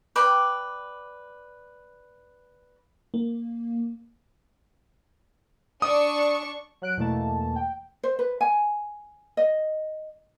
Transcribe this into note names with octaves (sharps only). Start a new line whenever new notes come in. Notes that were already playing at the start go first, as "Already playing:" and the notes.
B4 D5 G5
A#3
D4 C#6 D#6
F#3 F#6 D7
E2 B2 E3 A3 A#3 A5
G5
C5
B4
G#5
D#5